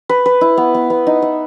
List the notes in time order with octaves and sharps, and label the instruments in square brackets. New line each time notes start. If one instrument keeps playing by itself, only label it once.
[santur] B4
B4
E4
B3
B3
B3
D#4
E5